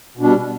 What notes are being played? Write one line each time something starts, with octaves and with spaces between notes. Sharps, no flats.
B2 G3 D4